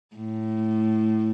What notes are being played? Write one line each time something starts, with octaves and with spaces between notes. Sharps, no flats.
A2